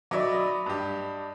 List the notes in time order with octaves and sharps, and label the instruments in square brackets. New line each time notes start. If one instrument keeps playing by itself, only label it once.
[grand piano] F#3 D#4 E5 [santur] D5 B5 D6
[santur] D#5
[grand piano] G2 G4